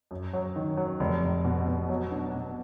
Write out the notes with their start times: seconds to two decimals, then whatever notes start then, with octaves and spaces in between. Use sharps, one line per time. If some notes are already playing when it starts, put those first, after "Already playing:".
0.11 F#2
0.33 F#3
0.56 D#3
0.77 F#3
1.00 F1
1.23 F1
1.44 B2
1.67 B2
1.89 F#3
2.11 D4
2.34 B2